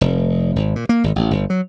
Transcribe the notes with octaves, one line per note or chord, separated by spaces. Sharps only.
F1
G#1
A#2
A#3
G#1
A1
G1
F#3